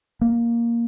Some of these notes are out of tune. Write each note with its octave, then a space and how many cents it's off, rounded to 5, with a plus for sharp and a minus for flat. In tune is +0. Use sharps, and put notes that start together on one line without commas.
A#3 +5